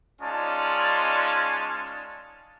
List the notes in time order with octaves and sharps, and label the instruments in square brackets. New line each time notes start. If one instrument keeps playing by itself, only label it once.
[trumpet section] G#3 C#4 D#4 F4 D5 A5